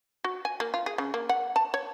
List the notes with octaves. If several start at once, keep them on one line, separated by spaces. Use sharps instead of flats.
F#4
G#5
A#3
F4
G#4
C#3
A#3
F#5
A5
C#5